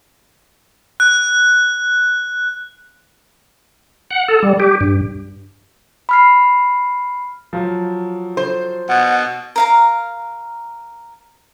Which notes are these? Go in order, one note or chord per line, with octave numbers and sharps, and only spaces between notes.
F#6
F#5
A4
G3
G4
G2
B5 F6 C7
F3 F#3
C5
B2 F#5
A#4 F5 A#5